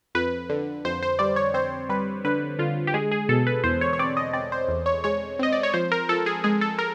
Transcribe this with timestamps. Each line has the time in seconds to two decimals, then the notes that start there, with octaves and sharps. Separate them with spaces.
0.15 F2 B4
0.50 D3
0.85 F2 C5
1.03 C5
1.19 G3 D5
1.36 C#5
1.54 C4 C5
1.89 G3 B4
2.25 D3 B4
2.59 D3 F4
2.87 G4
2.94 G#3 G#4
3.11 G#4
3.29 B2 A4
3.47 B4
3.64 E2 C5
3.81 C#5
3.93 C#5
3.99 C4 D5
4.17 D#5
4.33 C4 D5
4.52 C5
4.68 E2
4.86 C#5
5.04 G#3 C#5
5.39 C4 D#5
5.52 D5
5.63 C#5
5.74 F3 C5
5.92 A#4
6.09 F3 A4
6.26 G#4
6.44 G#3 G#4
6.61 A4
6.78 A#4